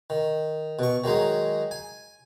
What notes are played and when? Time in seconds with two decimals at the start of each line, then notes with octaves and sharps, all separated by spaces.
0.10 D#3
0.79 B2 C#6
1.04 D#3 F#3 G#3 D#4
1.71 G#5